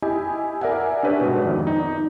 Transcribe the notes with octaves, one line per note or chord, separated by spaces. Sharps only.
E4 G4 D#5 G#5
A#4 D5 E5 F#5 G#5
D4 G4 B4 C#5 D5 E5
G#2 B2
F2 D#3 D5
D#4